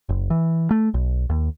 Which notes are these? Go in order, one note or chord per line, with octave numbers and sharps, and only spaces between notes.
F#1
E3
A3
B1
D#2